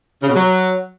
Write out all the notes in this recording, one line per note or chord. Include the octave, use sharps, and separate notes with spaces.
C#3
B2
F#3